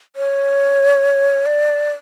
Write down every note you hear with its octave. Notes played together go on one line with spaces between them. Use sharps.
C#5
D5